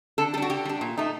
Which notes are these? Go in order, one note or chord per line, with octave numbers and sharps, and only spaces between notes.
D3 A4
G3 D4 F#4 A4
D3 G4
G3 D4
A#2
A3 D#4